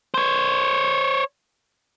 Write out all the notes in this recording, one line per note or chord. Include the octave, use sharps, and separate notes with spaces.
C5 C#5